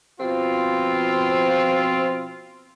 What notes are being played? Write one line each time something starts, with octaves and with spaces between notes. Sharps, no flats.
B2 F3 C4 F4